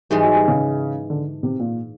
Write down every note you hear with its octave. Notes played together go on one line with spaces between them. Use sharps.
G#2 E3 G3 G#3
F#3
G3
C#3
D3
C3
A#2